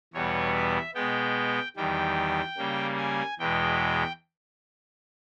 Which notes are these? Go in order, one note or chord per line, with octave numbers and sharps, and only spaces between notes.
E2 B2 G3 B3 C#5
E5
B2 G#3 B3 G5
E2 D#3 G3 G5
C#3 G3 A#3
G#5
E2 B2 G#3 G5